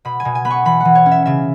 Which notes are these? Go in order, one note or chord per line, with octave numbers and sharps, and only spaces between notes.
B2 B5
G#5
B2
G#5
B3 B5
C#6
E3 B5
E3 F#5
C#5
C#4
E5
C#3 E5